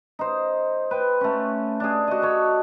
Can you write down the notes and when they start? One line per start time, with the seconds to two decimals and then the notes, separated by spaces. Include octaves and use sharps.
0.19 D#4 C5
0.91 B4 G5
1.21 A3 C#4
1.80 D4 G#4
2.07 F#4 D#5
2.22 A4 C#5